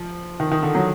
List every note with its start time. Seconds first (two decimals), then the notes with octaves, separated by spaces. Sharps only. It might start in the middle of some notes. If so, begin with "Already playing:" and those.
Already playing: F3
0.40 D#3
0.51 D#3
0.63 D3
0.75 F#3